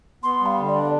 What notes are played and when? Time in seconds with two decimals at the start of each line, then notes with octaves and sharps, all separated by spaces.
0.23 B3 C6
0.41 G3
0.46 F5
0.58 D3
0.69 D5
0.75 D4